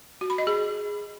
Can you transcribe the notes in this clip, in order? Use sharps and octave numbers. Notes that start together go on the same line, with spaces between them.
F#4
B5
D#5
G#4